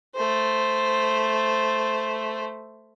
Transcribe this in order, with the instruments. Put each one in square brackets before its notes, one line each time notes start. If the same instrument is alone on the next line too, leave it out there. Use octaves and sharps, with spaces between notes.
[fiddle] A3 C5